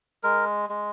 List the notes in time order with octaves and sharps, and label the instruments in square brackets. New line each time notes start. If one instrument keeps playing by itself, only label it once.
[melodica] G#3 A#4
G#3